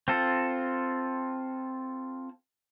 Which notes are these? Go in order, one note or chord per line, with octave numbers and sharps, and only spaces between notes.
C4 F4 A4